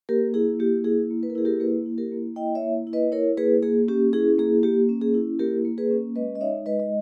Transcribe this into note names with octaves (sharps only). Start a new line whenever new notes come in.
A#3 G4 A#4
E4 G#4
A#3 G4
E4 G#4
A#3
B4
A#4
E4 G#4
G4 A#4
A#3 G#4 B4
E4
G4 A#4
A#3
E4 D#5 G5
C#5 E5
A#3
E4
B4 D#5
E4 A#4 C#5
A#3 G#4 B4
A#3 G#4
C#4 G4
E4 G#4
A#3 G#4
A#3 G4
C#4
G#4
E4
A#3 G4 A#4
A#3
G#4 B4
C#4
G#3 B4 D#5
D#5
D#4 C#5 E5
G#3 B4 D#5
D#5